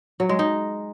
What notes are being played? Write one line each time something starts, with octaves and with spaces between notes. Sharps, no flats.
F#3
G#3
D#4